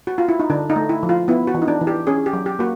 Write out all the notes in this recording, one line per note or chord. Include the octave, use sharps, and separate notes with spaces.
F#4
F4
E4
D#4
D3 D4
D#4
A3
E4
F3
F4
B3 E4
F#4
E3
D#4
D4
E3
G4
C#4 G#4
G4
F#3
G4
A#3 F#4